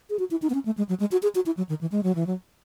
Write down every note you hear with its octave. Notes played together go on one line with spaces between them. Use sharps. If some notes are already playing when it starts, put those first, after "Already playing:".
G#4
F#4
E4
D#4
B3
C#4
A3
G#3
F#3
G#3
F#4
G#4
F#4
E4
F#3
D#3
E3
G#3
F#3
E3
F#3